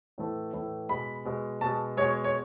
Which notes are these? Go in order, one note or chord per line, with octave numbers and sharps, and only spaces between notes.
A2 E3 A3
A2 E3 A3
B2 G#3 B5
B2 G#3
B2 G#3 A5
B2 G#3 C#5
C#5